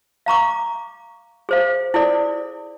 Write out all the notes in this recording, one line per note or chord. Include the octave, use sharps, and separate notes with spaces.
F5 A#5 C#6 D6
G#4 C5 F5
E4 G#4 A4 D5